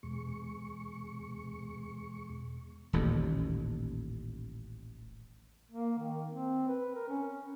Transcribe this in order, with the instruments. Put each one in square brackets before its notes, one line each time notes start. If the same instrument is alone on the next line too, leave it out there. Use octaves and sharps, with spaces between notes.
[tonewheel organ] E2 B2 G#3 C#6
[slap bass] D#1 A1 D#2
[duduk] A#3
D#3
C4
B4
A#4
C#4